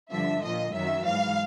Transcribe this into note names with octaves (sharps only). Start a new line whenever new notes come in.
G2 D3 F3 E5
A#2 F3 D#5
F#2 D#3 F#3 E5
G#2 E3 F5